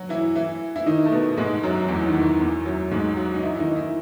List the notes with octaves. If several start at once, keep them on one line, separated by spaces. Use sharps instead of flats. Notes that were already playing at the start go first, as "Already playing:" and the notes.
Already playing: F#3 F#4
E3 E4
E3 E4
E4
D#3 D#4
A3
B2 B3
G#2 G#3
F#2 F#3
F#3
E2 E3
D#3
E2 E3
E2 E3
F#2 F#3
G#2 G#3
F#3 F#4
D#4
E3 E4
E4
D#3 D#4
E3 E4